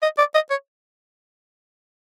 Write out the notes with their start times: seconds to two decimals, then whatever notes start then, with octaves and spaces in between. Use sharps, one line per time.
0.03 D#5
0.18 D5
0.34 D#5
0.50 C#5